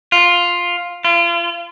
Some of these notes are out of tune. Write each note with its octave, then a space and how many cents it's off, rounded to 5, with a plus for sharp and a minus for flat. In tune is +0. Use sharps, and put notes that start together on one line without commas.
F4 +5
F4 -40